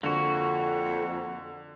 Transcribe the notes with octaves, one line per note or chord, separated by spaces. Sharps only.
F2 D3 A#3 F#4